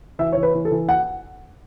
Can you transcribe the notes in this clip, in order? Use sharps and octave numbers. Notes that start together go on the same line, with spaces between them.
E3 E5
E3 C#5
B4
E3
A4
E3
F#5